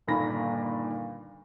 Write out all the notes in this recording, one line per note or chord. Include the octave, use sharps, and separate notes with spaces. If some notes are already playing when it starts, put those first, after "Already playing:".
G1 D#2 A#2 A#3 B5 A#6